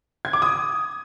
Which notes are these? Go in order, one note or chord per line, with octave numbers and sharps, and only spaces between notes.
G#6
D6
D#6